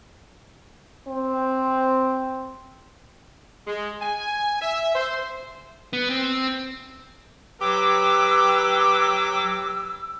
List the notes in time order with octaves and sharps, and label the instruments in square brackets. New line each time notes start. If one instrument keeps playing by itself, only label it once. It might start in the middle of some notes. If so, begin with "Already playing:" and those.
[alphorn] C4
[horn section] G#3
G#5
E5
C5
[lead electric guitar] B3
C4
[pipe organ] F#3 G5 D6 [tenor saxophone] G4 [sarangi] B4 [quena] E6